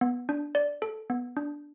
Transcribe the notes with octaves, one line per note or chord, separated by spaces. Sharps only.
B3
D4
D5
A4
B3
D4